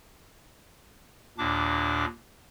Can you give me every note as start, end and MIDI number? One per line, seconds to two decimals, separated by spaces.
1.38 2.05 39
1.38 2.05 46
1.38 2.05 62
1.38 2.05 86